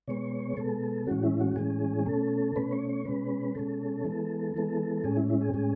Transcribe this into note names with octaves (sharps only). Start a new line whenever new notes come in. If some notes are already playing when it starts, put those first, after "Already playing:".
B2 G#3 B3 C#5
B2 G#3 B3 A4
A2 E3 G#3 C#4 F#4
E4
F#4
A2 E3 G#3 C#4 G#4
B2 A3 C#4 A4
B2 A3 C#4 B4
C#5
C#5
B2 G#3 C#4 B4
B2 G#3 C#4 A4
E3 G#3 B3
E3 G#3 B3
A2 G#3 C#4 G#4
E4
E4
G#4
A2 G#3 C#4 G#4